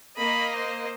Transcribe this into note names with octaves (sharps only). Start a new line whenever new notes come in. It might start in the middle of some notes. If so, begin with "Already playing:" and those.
A#3 D#5 B5
C5